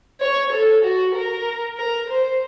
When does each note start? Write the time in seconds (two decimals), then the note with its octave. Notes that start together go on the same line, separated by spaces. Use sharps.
0.21 C#5
0.52 A4
0.84 F#4
1.15 A#4
1.78 A#4
2.10 C5